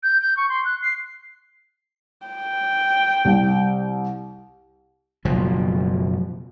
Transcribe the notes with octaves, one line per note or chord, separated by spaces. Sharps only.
G6
G6
C#6
C6
F#6
C7
G5
C2
F#1 B2 F3